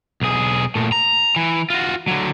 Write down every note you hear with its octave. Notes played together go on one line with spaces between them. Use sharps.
B1 G#4
A#2 A3
A#5
E3
F4 F#4
D3 F#3